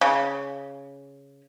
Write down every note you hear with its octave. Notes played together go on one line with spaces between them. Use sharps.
C#3